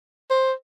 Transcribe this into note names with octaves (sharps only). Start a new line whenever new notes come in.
C5